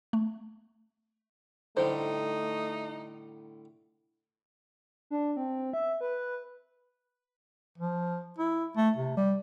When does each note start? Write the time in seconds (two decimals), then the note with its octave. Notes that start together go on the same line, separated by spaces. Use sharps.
0.13 A3
1.77 A2 D3 G3 A3 D#4 C5
5.11 D4
5.37 C4
5.73 E5
6.01 B4
7.78 F3
8.38 E4
8.77 A3
8.96 C3
9.17 G3